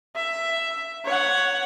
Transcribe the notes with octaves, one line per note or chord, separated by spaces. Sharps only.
E5
C#5 F#5